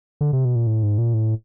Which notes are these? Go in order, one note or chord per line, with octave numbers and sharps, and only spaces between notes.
D3
C3
B2
A#2
A2
G#2
A#2
A2